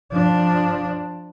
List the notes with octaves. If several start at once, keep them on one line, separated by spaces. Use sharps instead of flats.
F3 D4